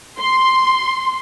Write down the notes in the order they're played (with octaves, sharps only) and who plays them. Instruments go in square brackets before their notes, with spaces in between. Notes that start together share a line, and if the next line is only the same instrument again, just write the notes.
[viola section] C6